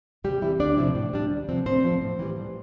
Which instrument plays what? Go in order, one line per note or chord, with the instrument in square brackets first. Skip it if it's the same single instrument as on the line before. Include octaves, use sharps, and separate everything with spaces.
[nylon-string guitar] C3 G3 G4
E3 G3 C4 E4
D2 D4 D5
C3 F3 C4 E4
A2
G3 D4
D2
C3 F3 C4
A2 C4 C5
F3 C4
A2
E3 G3
A2